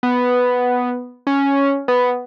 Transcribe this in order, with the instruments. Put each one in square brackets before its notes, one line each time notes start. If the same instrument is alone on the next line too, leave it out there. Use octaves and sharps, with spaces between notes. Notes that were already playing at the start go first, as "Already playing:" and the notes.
[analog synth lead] B3
C#4
B3